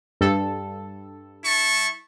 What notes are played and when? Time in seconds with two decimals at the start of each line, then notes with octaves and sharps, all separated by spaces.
0.21 G2 A4
1.45 E4 A5 C#6